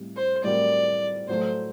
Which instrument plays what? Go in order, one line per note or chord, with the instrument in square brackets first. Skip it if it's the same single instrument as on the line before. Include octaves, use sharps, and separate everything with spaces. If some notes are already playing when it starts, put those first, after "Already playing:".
Already playing: [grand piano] A2 G3 C4
[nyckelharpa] C5
[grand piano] A2 G3 C4 F#4 A#4 [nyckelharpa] D5
[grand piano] A2 F#3 A3 [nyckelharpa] C5